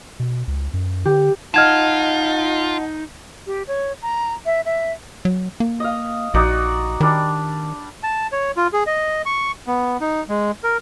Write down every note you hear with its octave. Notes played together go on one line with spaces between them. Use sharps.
B2
C#2
F#2
D3 G4
D#4 F4 D#5 F#5 A5 F6 G#6 E7
G4
C#5
A#5
E5
E5
F#3
A#3
D#5 F5
A#1 D#4 F#4 D5
D#3 G3 D4
A5
C#5
F4
G#4
D#5
C#6
B3
D#4
G#3
A#4